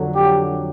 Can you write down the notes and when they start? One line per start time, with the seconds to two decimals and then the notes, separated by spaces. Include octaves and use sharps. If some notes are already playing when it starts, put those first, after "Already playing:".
Already playing: F2 D3 F#3
0.13 G4